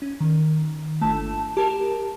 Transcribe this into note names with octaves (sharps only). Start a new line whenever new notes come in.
C#4
D#3
G1 A3 A5
G4 A#4 A5